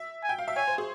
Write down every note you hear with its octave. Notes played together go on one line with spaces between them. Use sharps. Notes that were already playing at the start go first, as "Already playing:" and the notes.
Already playing: E5
G#5
G5
F5
E5
C#5 G#5
C5
G#4